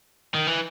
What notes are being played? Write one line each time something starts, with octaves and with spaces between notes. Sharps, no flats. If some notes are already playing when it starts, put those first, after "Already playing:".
D#3
E3